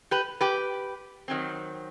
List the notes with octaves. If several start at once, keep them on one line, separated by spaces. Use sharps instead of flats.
G4 B4
G4 B4
D#3 F#3 C4